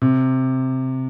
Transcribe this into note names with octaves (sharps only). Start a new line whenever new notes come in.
C3